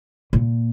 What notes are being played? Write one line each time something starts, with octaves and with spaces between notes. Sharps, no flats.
A#2